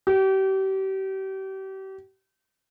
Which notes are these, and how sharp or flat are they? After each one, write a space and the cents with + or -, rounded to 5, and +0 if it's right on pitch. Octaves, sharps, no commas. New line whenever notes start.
G4 -35